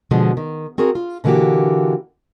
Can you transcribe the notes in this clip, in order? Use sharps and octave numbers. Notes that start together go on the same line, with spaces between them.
B2 D3 F3 G#3
D#3
C4 F#4 G#4 A#4
F4
B2 D3 E3 A#3 F#4 G4